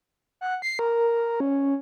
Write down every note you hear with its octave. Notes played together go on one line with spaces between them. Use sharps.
F#5
C7
A#4
C#4